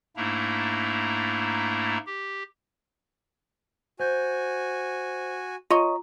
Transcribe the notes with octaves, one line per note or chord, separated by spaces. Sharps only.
G#2 A3 A#3 D4 E4 A#5
G4
F#4 C5 G#5 G6
F4 C#5 D#5 A#5